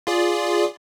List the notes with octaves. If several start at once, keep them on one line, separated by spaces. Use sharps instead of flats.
F4 G#4 D5